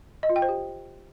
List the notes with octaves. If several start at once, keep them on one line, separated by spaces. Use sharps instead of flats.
D#5
F4
G5
C5
G4